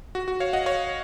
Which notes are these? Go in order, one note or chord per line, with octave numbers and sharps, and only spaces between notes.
F#4
F#4
C#5 F5
D#5 F#5
C#5 F5